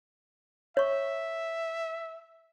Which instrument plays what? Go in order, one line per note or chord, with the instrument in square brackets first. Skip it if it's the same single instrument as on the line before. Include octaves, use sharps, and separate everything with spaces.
[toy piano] C#5 C#6 [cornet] E5